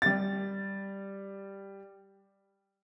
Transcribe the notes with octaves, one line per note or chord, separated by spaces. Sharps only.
G3 A6